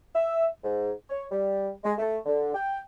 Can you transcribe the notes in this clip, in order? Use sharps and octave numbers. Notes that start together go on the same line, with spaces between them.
E5
G#2
C#5
G3
G#3
A3
D3
G5